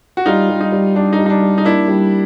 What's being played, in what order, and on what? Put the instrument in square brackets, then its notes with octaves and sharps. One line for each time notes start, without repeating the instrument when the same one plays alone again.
[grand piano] F#4
[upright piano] G3 [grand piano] D#4 F4
[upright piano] G3
[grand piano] D#4
[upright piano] G3
[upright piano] G3 [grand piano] D4
[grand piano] D#4
[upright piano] G3
[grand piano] D#4
D4
[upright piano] G3
[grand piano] D#4
[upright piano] A#3 [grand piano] D4 E4
[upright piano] G3